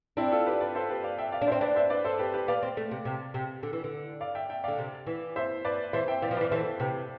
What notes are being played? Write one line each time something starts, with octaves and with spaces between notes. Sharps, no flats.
C4 D4 E4
F4 A4
G4 B4
B4 D5
A4 C5
G4 B4
D5 F5
E5 G5
D5 F5
D4
C4 C5 E5
D4 B4 D5
C5 E5
B4 D5
A4 C5
G4 B4
G4 B4
B3 D5 F5
C4
A3
C3
C3
C3
D3
E3
D3
D5 F5
E5 G5
E5 G5
D3 D5 F5
C3
E3
C5 E5
B4 D5
E3 C5 E5
E5 G5
E3 D5 F5
F3
E3 B4 D5
E3 A4 C5
C3 G4 B4